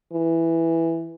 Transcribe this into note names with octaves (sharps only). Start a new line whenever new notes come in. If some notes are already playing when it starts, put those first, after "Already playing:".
E3